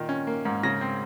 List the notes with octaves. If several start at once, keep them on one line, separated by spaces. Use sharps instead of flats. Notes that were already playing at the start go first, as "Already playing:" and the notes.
Already playing: A#2 D#3
C#4
A#3
G#2
C#3 A#6
C4